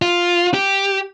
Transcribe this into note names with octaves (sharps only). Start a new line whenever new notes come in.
F4
G4